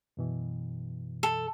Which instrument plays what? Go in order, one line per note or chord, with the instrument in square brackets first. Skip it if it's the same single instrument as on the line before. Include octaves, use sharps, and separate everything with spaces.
[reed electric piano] F#2 B2 E3
[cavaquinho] A4